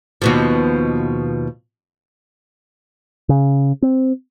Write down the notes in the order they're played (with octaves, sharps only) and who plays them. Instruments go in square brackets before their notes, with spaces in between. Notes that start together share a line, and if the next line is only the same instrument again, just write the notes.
[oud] D#2 B2 F3
[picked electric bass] C#3
C4